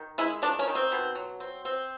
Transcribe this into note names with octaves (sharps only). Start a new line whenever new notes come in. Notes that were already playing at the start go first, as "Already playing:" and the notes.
Already playing: D#3
G#3 E4
D#3 D4
C#4
D#3
C4
B2
F#3
C4
C4